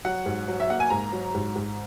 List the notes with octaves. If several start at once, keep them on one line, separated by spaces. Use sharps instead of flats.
F#3 F#5
G#2
F#3
E5
A#3 F#5
G#5
G#2 A#5
F#3
G#2
G#2